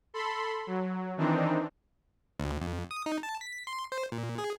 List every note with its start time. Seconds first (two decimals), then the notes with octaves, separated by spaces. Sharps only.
0.14 A4 B5 C6
0.67 F#3
1.17 D#3 E3 C4 D4 D#4
2.40 D2
2.61 F2
2.91 D#6
3.06 D#4
3.23 A5
3.41 B6
3.67 C6
3.92 C5
4.12 A#2
4.38 G#4